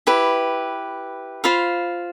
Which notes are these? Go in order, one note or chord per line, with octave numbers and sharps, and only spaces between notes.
E4 G4 B4
F4 C5 F5 B5